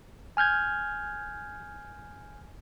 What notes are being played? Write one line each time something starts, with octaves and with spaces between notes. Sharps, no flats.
G#5 F6 G6 G#6